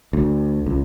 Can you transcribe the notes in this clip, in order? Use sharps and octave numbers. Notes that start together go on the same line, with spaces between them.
D2
C#2